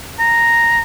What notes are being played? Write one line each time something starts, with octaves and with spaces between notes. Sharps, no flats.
A#5